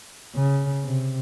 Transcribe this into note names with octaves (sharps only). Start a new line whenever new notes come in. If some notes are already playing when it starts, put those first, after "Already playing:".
C#3
C3